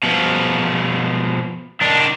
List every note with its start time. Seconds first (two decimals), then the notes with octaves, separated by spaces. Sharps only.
0.04 B2 F3
1.81 D#3 D4